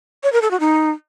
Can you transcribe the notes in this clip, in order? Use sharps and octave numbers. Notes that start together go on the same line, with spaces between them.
C#5
A#4
A4
F#4
D#4